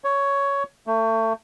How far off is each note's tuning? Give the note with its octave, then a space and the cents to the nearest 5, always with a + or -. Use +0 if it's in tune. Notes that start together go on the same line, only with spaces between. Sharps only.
C#5 +10
A3 +30